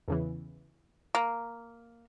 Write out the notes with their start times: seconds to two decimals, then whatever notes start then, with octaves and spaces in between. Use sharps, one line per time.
0.08 E2 C#3 E3
1.15 A#3